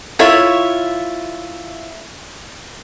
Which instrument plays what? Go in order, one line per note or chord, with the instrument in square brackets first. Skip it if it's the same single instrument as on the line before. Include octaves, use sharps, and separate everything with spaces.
[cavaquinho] E4 F4 C#5 E5